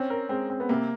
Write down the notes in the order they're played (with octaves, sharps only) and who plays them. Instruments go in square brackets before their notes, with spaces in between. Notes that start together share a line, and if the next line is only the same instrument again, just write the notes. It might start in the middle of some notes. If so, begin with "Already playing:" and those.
Already playing: [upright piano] C4 [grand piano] C#4
[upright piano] A#4
[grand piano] G#3 [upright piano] C4
[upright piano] C4
[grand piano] B3
[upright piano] C3 [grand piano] A#3